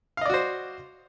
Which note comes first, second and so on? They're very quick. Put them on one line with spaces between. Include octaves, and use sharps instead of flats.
F5 D#5 D5 F#4 C5